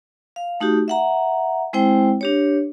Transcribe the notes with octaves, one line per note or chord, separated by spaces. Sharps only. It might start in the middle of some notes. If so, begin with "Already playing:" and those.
F5
A3 D#4 F#4 G4
E5 F#5 A#5
G#3 C4 E4 C5 G5
D4 G4 C#5